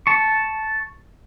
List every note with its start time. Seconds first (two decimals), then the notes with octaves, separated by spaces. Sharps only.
0.07 A5 C#6